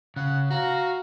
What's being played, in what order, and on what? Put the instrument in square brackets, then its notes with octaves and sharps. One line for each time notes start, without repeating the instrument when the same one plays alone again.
[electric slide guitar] C#3 [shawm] F#5
[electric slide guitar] F#4 [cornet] F5 [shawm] A#5